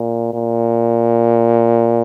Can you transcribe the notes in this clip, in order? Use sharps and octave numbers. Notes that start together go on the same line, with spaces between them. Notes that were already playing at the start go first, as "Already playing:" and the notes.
Already playing: A#2
A#2